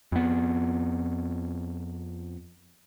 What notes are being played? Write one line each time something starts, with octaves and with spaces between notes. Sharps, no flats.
F2 B3